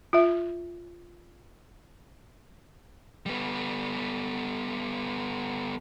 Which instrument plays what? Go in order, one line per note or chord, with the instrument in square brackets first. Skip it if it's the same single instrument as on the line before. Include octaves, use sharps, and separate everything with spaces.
[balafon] F4 E5
[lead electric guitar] G3 B3